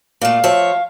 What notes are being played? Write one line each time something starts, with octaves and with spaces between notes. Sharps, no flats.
A#2 A3 F5
F3 C#5 E5